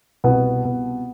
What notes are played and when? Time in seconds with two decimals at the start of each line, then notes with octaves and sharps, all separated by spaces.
0.24 C2 B2 B3
0.65 B2